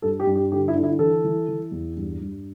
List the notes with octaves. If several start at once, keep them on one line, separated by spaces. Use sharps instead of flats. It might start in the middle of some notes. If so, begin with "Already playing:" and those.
G2 A4
G4
G2
G4
D3 G4
E4
D3
E4
E3 A4
E3
E3
E2
G2
G2